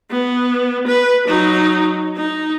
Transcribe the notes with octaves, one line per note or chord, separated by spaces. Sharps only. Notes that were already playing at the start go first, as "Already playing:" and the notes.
B3
B4
F#3 D#4
D#4